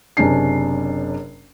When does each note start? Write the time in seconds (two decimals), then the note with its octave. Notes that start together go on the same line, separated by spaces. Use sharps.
0.17 F#1 C3 C#4 D4 C7